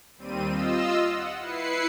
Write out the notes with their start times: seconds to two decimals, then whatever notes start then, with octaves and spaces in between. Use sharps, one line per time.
0.17 D#2 G3 C4 D#7
0.47 F4 D#5 E6
1.09 F#5
1.40 E4 B4 C7 C#7